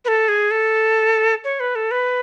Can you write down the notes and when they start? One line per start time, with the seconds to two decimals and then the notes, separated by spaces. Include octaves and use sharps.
0.05 B4
0.08 A4
0.28 G#4
0.51 A4
1.44 C#5
1.60 B4
1.75 A4
1.91 B4